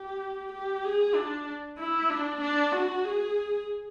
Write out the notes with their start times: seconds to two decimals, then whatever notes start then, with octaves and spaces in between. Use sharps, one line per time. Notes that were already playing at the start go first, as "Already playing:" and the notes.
Already playing: G4
0.52 G4
0.85 G#4
1.15 D4
1.78 E4
2.10 D4
2.41 D4
2.73 F#4
3.04 G#4